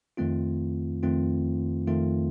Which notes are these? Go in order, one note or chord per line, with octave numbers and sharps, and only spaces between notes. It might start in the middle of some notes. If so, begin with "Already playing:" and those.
F2 D#3 A3 C4 F4
F2 D#3 A3 C4 F4
F2 D#3 A3 C4 F4